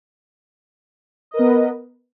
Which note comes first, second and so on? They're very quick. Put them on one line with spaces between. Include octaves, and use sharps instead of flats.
D#5 A#4 B4 B3